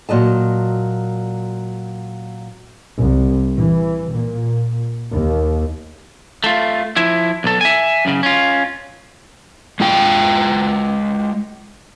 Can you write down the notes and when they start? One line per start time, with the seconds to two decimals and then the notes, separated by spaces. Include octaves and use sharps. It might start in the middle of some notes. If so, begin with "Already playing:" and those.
0.09 A#2 F#3 D#5 A5
2.99 C2
3.56 E3
4.11 A#2
5.12 D#2
6.44 A3 F4
6.96 F3 E4
7.44 B1 A4
7.61 E5 G#5
8.05 F#2 C#3
8.23 C#4 F4
9.80 G#3 F4 G5